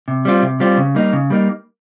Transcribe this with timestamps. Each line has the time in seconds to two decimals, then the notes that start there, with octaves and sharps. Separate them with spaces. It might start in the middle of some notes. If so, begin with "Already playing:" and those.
0.08 C3
0.25 G3 C4 F4
0.42 C3
0.60 G3 C4 F4
0.78 C#3
0.95 G3 A#3 D#4
1.13 C#3
1.30 G3 A#3 D#4